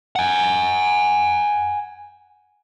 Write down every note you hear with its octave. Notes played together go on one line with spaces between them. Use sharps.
F#5 G#5